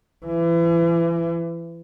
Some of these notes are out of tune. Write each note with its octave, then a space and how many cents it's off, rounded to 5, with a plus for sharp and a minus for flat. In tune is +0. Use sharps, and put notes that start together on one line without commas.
E3 +35